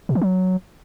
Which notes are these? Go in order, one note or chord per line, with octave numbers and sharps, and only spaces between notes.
B2
E3
F#3